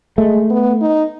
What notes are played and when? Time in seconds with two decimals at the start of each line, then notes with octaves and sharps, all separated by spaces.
0.17 G#3 A3
0.50 B3
0.81 D#4